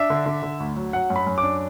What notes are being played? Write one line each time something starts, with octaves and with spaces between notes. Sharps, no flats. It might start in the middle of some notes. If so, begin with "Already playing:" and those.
Already playing: D4 E5
D3
D3
D3
D2
F#3
F#3 F#5
F#2
B5
F#2
D6
D4